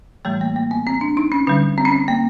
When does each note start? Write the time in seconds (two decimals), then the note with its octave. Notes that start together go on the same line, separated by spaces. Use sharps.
0.25 A2 E3 G3 A3
0.41 A#3
0.56 A#3
0.71 B3
0.87 C4
1.01 D4
1.17 D#4
1.32 C#4
1.47 D3 G3 C#4
1.78 C4
1.85 C#4
1.92 C4
2.08 A#3